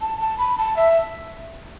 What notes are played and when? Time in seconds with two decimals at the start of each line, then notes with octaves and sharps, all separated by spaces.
0.01 A5
0.20 A5
0.38 B5
0.58 A5
0.76 E5